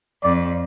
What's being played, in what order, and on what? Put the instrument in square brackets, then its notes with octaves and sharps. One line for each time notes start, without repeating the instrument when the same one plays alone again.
[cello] F2 [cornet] D5